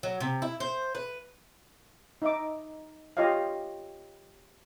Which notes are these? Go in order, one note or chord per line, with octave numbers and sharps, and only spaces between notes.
F#3
C3
E4
C5
B4
D#4 E5 D6
F4 G4 C#5 D#5 F5